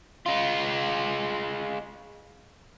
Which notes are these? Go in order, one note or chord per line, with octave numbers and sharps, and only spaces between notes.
G#3 F4